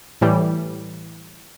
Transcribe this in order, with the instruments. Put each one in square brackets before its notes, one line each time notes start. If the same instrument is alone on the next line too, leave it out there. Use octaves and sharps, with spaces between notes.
[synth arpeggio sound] A2 E3 G3